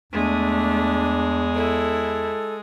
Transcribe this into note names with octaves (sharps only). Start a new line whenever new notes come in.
E2 G#3 A3 D4
E4 A4